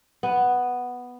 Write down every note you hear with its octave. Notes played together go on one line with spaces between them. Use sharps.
B3